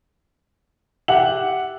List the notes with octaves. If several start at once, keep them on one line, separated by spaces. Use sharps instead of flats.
G4 E5 F#5 F#7